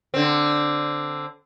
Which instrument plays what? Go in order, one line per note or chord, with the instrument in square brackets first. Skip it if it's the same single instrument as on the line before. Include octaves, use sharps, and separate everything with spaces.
[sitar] D3 C4